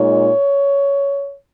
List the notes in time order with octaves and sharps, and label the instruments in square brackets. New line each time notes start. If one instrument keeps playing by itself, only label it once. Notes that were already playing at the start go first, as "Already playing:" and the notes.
Already playing: [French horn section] A#2 G#3 D#4 C#5